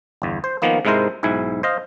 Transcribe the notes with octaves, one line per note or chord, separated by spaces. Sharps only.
G1 E2
C5
D#3 F3 A#3 B3
G#2 C3 G#3 E4 A#4 C5
B1 G#2 E4 G#5
C5 D#5 F5